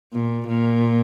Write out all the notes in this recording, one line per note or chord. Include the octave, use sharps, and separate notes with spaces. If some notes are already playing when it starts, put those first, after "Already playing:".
A#2
A#2